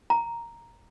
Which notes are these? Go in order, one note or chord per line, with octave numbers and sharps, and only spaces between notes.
A#5